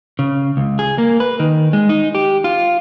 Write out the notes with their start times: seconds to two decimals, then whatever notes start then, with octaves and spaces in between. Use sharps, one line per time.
0.19 C#3
0.57 C#2
0.79 G#4
0.98 A#3
1.20 B4
1.40 D#3
1.73 G#3
1.89 D#4
2.15 G4
2.44 F4